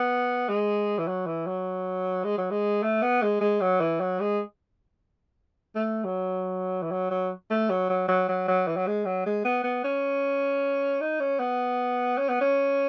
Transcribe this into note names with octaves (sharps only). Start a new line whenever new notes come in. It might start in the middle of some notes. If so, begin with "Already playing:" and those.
Already playing: B3
G#3
E3
F#3
E3
F#3
G#3
F#3
G#3
A3
B3
G#3
G#3
F#3
E3
F#3
G#3
A3
F#3
E3
F#3
F#3
A3
F#3
F#3
F#3
F#3
F#3
E3
F#3
G#3
F#3
G#3
B3
B3
C#4
D#4
C#4
B3
C#4
B3
C#4